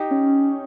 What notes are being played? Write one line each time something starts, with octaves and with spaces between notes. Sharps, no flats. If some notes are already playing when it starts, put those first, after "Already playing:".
Already playing: D#4 G4
C#4